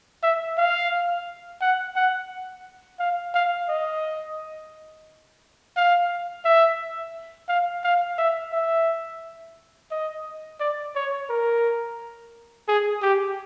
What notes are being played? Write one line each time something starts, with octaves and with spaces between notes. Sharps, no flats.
E5
F5
F#5
F#5
F5
F5
D#5
F5
E5
F5
F5
E5
E5
D#5
D5
C#5
A#4
G#4
G4